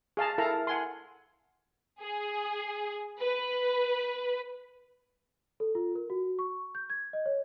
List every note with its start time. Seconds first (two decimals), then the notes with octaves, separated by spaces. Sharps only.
0.17 G#4 F5 A5 A#5
0.38 E4 A4 A#4 F5 A#5
0.67 F#5 G#5 C6
2.00 G#4
3.20 B4
5.60 A4
5.75 F4
5.95 A#4
6.10 F#4
6.39 C#6
6.75 G6
6.90 G#6
7.13 D#5
7.26 C#5